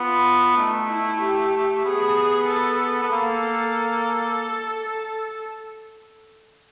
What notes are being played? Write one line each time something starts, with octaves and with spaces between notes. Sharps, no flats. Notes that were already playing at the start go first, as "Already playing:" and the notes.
Already playing: B3 F4
A3 D#4
E4
G4
B3 G#4
A4
B3
A#3 A4